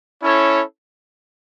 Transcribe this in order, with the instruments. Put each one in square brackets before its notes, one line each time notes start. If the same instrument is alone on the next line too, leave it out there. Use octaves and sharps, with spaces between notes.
[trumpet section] C#4 E4 A4 C#5